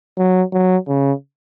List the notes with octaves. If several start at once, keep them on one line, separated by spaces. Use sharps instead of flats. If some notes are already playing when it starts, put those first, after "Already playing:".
F#3
F#3
C#3